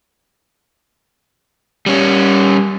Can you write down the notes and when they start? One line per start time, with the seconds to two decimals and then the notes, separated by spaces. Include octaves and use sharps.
1.86 G3 C#4